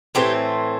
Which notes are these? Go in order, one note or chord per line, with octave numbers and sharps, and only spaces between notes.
A2 E3 A3 C4 G4